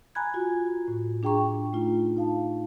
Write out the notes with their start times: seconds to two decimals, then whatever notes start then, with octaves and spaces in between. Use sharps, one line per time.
0.15 G#5 A#5 B5 F#6 G#6
0.34 F4 F#4
0.88 A2
1.23 D4 G#4 G5 A#5 C#6
1.73 A3 D#4 F4
2.17 D#4 F5 A5